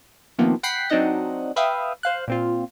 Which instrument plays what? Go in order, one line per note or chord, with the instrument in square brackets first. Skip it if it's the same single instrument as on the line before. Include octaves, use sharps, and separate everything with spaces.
[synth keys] C3 D#3 F3 A#3 B3
F#5 G5 B5 B6 C7
F#3 C4 D4 D#4 D#5 F#5
B4 E5 F5 G5 D#6
C5 F5 F#6
A#2 C4 F4